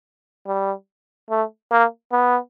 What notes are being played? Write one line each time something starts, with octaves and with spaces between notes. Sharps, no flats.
G3
A3
A#3
B3